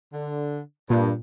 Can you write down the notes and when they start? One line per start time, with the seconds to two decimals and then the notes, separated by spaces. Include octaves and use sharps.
0.13 D3
0.90 G2 A#2